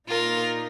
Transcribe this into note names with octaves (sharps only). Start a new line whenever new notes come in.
A#2 A#3 D#4 F4 A#4